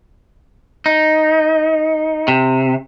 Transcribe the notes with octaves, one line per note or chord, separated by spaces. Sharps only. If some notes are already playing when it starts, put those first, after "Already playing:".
D#4
C3